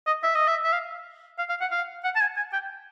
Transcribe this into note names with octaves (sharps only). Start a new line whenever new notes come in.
D#5
E5
D#5
E5
E5
F5
F5
F5
F#5
F5
F#5
A5
G#5
G#5
G5